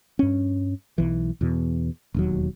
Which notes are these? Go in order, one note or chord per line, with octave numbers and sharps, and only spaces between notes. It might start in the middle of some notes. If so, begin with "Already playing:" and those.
G2 C#4
B1 E3
E2 B2
E1 D#2 F#3